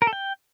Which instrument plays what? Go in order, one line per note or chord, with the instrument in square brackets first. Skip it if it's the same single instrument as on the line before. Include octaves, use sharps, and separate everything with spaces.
[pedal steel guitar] A#4
A4
G5